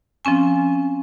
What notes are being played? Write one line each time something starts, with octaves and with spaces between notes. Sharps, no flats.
F3 C4 C#4 G#5